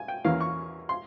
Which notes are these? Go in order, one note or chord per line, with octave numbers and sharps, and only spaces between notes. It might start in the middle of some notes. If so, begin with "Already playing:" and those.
Already playing: G#5
G5
E2 E3 A#3 C#4 F5
C#6
C6